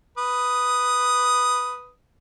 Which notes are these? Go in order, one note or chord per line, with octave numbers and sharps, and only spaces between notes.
B4 D#6